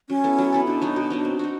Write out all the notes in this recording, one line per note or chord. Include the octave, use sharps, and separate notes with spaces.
F#3 C#4
B3 E4 A4
F#3
B3 E4 A4
B2 D4
F#3 B3 D#4
B2
F#3 B3 D#4
C4
D#4 F#4